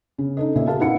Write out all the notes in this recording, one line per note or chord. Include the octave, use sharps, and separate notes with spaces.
C#3
D#4 A4 D#5
A#2 C#3 A#4 E5
F#4 G#4 A#4 F5 A5
B3 D#4 E4 F#5 C#7